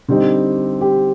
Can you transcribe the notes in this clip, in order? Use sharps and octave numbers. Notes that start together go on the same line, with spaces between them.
D3 G3 C4 D#4
G4